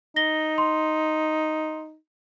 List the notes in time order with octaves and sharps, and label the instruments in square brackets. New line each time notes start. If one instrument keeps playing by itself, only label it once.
[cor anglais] D#4 [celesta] A#6 G7
[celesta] C6